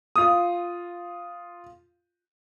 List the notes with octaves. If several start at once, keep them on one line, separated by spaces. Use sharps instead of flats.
F4 D#6